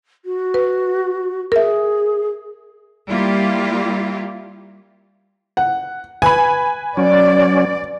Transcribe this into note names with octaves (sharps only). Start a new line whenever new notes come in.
F#4
B4
G#4 A#4 E5
G3 A#3 E4 F4 G4
F#5
B4 G#5 B5
F#3 C#4 D5